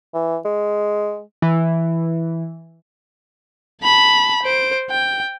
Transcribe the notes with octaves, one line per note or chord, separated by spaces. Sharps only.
E3
G#3
E3
A5 B5
C5 D7
G5